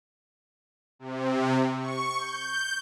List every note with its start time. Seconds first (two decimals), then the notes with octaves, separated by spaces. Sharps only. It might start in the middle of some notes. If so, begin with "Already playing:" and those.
0.99 C3
1.79 C#6
2.17 G6